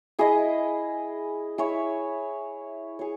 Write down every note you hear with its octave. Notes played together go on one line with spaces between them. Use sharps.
E4 G#4 D#5
E4 G#4 C#5 E5
G#4 C#5